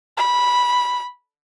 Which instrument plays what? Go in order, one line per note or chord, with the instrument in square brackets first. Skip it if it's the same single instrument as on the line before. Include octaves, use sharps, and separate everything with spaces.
[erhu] B5